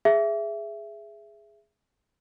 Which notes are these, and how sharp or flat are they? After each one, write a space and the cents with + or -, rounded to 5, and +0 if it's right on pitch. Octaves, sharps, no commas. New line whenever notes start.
G#4 +0 E5 +15